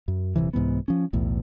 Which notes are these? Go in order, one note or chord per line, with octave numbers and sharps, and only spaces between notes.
F#2
D#1 D2 C3 E3
C2 G#2 E3 B3
F3 C#4
B1 E2 A2